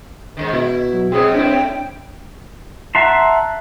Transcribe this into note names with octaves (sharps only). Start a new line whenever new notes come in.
G#2 D3 D#3
B2 E4
F#3
G#2 C#3 B3 C4 G#4 E6
A2 D4 E4 G5
E5 F#5 A5 A#5 C6